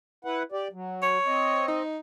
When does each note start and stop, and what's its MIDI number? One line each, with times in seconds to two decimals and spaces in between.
0.25 0.43 64
0.25 0.43 71
0.25 0.43 78
0.52 0.68 67
0.52 0.68 74
0.72 1.18 54
1.02 1.67 73
1.26 1.82 60
1.26 1.82 75
1.68 1.98 63